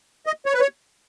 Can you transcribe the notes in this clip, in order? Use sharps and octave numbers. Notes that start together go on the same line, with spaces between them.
D#5
C#5
B4
C#5